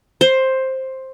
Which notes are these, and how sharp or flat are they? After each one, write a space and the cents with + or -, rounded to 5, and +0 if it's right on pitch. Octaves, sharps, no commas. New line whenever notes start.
C5 +10